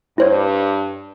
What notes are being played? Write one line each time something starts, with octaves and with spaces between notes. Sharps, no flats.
G2 E4 C5 C#5